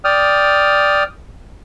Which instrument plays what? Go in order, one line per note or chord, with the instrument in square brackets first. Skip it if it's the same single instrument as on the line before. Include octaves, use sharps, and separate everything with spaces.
[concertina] D5 G5 D#6 F6